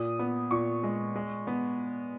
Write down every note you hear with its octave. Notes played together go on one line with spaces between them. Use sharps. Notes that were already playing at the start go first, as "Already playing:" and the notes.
Already playing: A#2 D#6
B3
A#2 C#6
G#3
G#3
B3